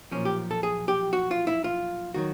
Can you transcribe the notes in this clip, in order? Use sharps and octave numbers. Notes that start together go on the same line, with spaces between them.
B1 A#2 F3 C#4
G4
A4
G#4
G4
F#4
F4
E4
F4
D#3 F#3 F#4